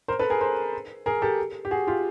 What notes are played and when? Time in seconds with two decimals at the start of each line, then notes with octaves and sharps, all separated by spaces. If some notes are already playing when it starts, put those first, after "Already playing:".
0.08 A#4 C5
0.19 A4 B4
0.30 G#4 A#4
0.41 A#4 C5
1.06 G#4 A#4
1.22 G4 A4
1.65 G4
1.71 F#4 G#4
1.87 F4 G4